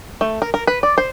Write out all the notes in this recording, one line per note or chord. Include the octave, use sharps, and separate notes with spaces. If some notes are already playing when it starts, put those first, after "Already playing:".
A3
A#4
A#4
B4
D5
C5